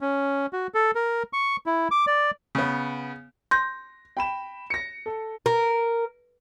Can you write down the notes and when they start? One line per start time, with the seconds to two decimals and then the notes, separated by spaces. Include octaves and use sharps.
0.01 C#4
0.53 F#4
0.74 A4
0.95 A#4
1.33 C#6
1.66 E4
1.91 D6
2.07 D5
2.55 C#3 B3
3.51 C6 G6 A#6
4.17 G5 B5 E7
4.70 A#6 C#7
5.06 A4
5.46 A#4